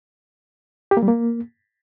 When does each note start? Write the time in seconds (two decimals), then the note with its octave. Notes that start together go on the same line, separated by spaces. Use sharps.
0.91 G4
0.97 A#3
1.02 G3
1.08 A#3